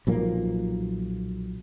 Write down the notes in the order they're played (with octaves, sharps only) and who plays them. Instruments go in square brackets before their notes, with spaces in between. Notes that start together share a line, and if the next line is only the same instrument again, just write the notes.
[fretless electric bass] B1 A#2 F3 A#3